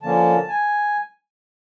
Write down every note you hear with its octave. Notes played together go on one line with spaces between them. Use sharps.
D3 F3 A#3 C#4 A5
G#5